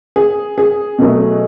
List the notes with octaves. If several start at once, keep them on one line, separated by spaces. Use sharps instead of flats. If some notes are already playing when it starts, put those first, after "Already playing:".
G#4
G#4
B2 F#3 A3